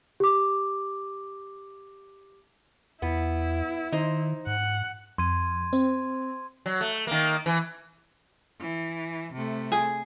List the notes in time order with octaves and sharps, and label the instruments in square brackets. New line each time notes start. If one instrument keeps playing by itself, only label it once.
[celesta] G4 D6
[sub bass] E2 [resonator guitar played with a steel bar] B3 [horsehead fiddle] E4
[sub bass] D#3 [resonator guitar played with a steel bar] D#4 C5
[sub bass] G#2 [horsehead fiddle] F#5
[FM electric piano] F2 [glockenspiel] C6 G#6 D#7
[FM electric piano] C4
[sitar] F#3
A3
D#3 A#3
E3
[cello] E3
C3 A3
[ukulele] G#4